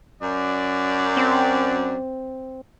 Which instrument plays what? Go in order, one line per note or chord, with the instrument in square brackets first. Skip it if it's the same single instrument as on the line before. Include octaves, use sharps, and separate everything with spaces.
[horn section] F#2 D5
[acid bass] C4